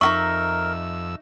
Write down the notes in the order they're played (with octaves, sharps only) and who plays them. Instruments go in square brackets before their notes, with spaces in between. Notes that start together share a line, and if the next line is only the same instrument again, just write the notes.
[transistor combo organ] F2 E6 [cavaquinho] D#4 F#4 E5 [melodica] A#4 [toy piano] C#6